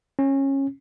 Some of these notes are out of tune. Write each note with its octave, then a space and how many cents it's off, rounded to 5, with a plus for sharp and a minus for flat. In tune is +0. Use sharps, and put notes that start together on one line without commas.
C#4 -20